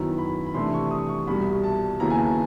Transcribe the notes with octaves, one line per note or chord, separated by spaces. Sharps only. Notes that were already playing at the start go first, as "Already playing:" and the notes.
Already playing: F#2 D#3 F#3 B3 E4 A#5
B5
B5
C3 E3 A3 D4 C6
C#6
D#6
C#6
C2 B2 G3 B5
A5
D#2 C#3 F#3 B3 E4 A#5
G#5
A5